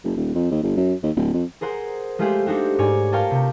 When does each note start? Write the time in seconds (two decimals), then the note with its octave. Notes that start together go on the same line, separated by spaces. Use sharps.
0.04 F#1
0.17 D#1
0.35 F2
0.51 D#2
0.63 G1
0.77 F#2
1.03 D#2
1.16 D1
1.34 F2
1.61 G#4 A#4 C5 F#5
2.19 G#3 A3 F4 G4 G#4 C5
2.46 D4 D#4 F#4 G4
2.78 G#2 C#5 D5 G#5
3.12 F4 A#4 C#5 F5 G5 A5
3.31 C3